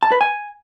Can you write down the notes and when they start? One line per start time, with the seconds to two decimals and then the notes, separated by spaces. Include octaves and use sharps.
0.03 A5
0.12 B4
0.21 G#5